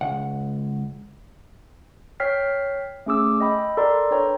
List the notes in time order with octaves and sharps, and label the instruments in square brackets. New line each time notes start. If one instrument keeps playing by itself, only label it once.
[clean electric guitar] C#2 F#5
[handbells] C#5 G5 F6 B6 C7
A3 C#4 G#4 D6 E6
D#5 G5 B5
A4 A#4 D5 A#5 C6
D4 B4 C#5 G5 A#5